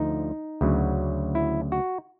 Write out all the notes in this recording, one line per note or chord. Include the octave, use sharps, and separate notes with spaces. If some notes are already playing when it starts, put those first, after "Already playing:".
Already playing: D2 D3 F3 D#4
D2 C#3 F#3
E4
F#4